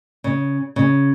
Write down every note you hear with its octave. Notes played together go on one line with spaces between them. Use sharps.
C#3
C#3